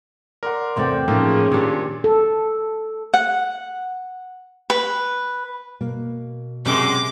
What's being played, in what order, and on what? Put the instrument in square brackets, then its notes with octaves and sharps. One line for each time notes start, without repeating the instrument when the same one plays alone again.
[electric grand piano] A#4 F#5 [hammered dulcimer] D5 C6
[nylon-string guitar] E2 C3 A3 [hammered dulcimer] C5 D5 G5
[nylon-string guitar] A2 D#4 [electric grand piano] F3 A#3 A4 [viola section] C#4 G#4
[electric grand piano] A#2 D4 [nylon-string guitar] D#3 G4
[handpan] A4
[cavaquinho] F#5
B4
[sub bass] B2 [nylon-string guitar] A#3
[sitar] F#2 G#3 [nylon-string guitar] C3 [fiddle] D6